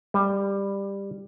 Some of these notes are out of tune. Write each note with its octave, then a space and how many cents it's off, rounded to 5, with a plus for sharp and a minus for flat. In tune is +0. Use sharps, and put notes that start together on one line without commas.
G3 +15